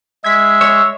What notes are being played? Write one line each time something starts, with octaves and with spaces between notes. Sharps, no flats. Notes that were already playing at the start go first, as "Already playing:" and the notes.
G#3 E5 G#6 B6
C#5 E6